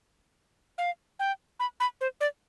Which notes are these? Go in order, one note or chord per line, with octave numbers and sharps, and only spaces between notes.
F5
G5
B5
B5
C5
D5